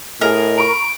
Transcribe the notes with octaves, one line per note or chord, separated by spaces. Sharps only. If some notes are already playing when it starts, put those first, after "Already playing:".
A2 G#4 A#4 D#5
A#5 B5 C#6 D7